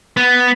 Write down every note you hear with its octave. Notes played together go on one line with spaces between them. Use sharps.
B3